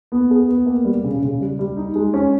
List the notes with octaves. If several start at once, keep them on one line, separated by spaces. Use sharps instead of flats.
B3
G#4
B3
A#3
G3
C#3
C#3
G3
G3
D#4
G#3
C#4